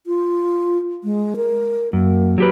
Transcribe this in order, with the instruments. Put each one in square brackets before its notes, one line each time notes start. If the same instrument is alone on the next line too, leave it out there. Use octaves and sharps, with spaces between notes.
[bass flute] F4
G#3
A#4
[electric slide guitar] F#2 [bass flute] A#3
[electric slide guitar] F#3 G4 B4